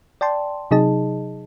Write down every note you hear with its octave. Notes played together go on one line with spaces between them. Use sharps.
D5 G5 A5 C6
C3 F#3 D#4 G#4 D#5 A5